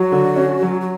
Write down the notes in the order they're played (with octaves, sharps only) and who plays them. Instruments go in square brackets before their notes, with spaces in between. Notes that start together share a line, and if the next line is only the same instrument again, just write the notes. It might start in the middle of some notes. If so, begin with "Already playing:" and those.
Already playing: [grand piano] F#3 [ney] F#4
[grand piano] D3
C#4
F#3
[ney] F#4